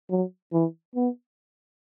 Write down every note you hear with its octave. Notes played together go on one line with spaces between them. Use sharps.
F#3
E3
B3